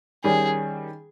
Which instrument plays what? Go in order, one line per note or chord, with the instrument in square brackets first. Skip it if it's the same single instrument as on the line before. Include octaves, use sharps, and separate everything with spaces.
[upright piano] D#3 G3 C#4 [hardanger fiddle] G#4